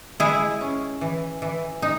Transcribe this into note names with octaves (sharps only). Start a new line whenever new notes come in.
G#3 E4 G#4
C#4
E3
E3
D#4